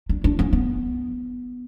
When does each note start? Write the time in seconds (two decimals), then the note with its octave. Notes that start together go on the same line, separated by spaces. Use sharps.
0.09 D4
0.24 D4
0.39 C#4
0.53 B3